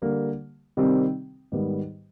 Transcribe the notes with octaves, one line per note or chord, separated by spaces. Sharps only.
D3 G3 A#3
C3 D#3 G3 C4
G#2 D#3 G3 B3